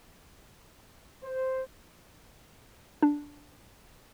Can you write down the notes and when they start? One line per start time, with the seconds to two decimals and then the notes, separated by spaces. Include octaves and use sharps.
1.24 C5
3.03 D4